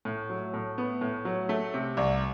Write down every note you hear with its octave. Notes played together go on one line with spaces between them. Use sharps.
A2
F#3
A2
B3
A2
F#3
A3
C3
C2